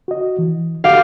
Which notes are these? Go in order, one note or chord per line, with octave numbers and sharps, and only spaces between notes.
F#4 D#5
E3
F#4 G4 F5 F#5